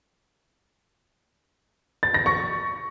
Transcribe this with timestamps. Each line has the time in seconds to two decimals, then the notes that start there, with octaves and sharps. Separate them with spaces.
2.03 A6
2.14 A#6
2.26 C#6